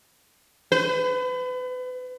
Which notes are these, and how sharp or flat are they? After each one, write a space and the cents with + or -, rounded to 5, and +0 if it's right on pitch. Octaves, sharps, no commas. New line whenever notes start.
B4 +35